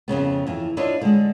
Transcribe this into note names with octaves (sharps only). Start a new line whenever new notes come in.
F2 G#2 C#3 B3
F2 E3
D4 E4 F4 B4 C#5 D#5
D3 G#3